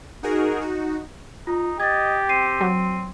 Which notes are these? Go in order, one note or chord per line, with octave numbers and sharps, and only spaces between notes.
D#4 F#4 G#4 A#4
D#4 F#4
D#4 F4
G4 D#5 G#6 A6
C4 C7 D#7
F#3